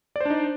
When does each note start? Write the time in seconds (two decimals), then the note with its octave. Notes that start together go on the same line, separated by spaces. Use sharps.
0.16 D5
0.21 C5
0.25 D4
0.30 D#4